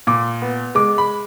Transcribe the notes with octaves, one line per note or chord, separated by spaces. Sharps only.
A#2 D6
B3
G#3 D6
B5